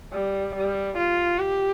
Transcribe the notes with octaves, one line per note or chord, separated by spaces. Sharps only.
G3
G3
F4
G4